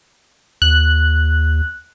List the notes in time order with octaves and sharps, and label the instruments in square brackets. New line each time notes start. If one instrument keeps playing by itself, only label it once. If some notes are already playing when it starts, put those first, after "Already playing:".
[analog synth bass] D#2 [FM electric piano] F#6